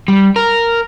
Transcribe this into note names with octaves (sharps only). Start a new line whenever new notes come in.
G3
A#4